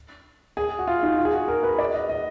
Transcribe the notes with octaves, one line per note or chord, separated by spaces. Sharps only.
G#4
F#4
F4
D#4
F4
G#4
F#4
A#4
B4
D5
D#5
D#5